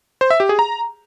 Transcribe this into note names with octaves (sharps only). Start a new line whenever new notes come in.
C5
E5
G4
G#4
A#5